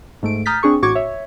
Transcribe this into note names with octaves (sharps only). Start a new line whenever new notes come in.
G#2 A3 D7
A#5 D#6 F6 G6 A6 B6
C4 D4 G#4 C#6
A1 A2 F#4 C#6 D6 G#6
C#5 E5